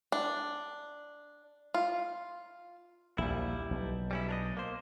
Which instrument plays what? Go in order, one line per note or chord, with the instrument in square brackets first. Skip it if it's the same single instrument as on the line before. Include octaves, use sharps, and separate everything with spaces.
[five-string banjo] D4
F4
[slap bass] A#1 D#2 [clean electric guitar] G3 E4
[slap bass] B1
[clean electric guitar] G3 C#4 E4
D4 A#4 D#5
A#3 C5